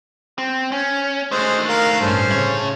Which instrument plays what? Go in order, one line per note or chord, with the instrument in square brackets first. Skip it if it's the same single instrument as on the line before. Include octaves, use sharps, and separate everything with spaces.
[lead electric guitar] C4
C#4
[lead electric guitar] D#3 A3 [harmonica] G#3 C5
[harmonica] A#4 F5
[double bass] A1 G2 [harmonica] C#4 A4 C5
[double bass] C#3 [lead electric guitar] E4 C#5